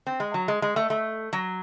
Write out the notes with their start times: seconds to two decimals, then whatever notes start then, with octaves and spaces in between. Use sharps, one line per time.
0.07 C4
0.20 G#3
0.34 F#3
0.48 G#3
0.62 G#3
0.76 A3
0.90 A3
1.33 F#3